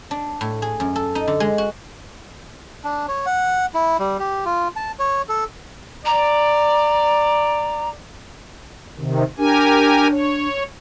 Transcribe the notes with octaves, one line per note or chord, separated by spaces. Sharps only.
D4
A2
G#4
F#2
A4
D#4
D3
G#3
F#4
D4
C#5
F#5
E4
G3
G4
F4
A5
C#5
A4
D5 A#5
C3 D#3
D4 G4 A#4 G#5
C#5